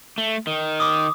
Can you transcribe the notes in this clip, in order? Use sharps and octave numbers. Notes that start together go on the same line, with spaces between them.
A3
D#3
D6 D#6